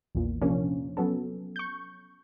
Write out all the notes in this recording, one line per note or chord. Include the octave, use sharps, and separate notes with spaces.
A#1 E2 A#2
C3 F3 A#3 C#4 D4
F#3 B3 C#4 A4
C#6 G6